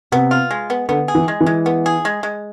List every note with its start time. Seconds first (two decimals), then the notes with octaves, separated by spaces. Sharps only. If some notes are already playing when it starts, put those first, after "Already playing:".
0.12 C3 B3
0.31 F4
0.51 G#3
0.70 B3
0.89 D3 B3
1.08 G#4
1.15 E3
1.28 G#3
1.41 E3
1.46 G#3
1.66 B3
1.86 G#4
2.05 G#3
2.23 G#3